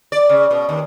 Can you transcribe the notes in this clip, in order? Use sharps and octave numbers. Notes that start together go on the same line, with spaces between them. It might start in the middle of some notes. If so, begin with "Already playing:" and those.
D5
C#3
B2
D#2